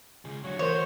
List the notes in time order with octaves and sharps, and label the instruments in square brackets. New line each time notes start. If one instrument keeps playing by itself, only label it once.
[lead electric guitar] C#2 G#4
[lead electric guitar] D3 F#3 [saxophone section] F#4 C#5
[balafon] E3 A#4 [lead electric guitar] A3 F#4 [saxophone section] C5 [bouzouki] C#5